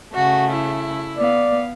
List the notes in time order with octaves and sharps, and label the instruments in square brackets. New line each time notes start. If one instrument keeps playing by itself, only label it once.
[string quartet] C#3 A3 [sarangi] F#4
[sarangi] E4
[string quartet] B3 F5 [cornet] D5